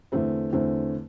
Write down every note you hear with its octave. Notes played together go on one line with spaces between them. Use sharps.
E2 D3 A3 C4
E2 D3 A3 C4